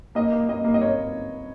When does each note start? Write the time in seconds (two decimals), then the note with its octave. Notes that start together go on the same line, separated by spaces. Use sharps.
0.15 A#3 D#5
0.32 A#3
0.48 A#3 D#5
0.64 A#3
0.74 D#5
0.81 A#3 C#5